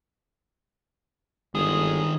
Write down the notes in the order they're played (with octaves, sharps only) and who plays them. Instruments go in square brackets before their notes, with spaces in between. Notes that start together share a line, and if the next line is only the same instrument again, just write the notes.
[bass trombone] G1 [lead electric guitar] D#3 G#3 [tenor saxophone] G#4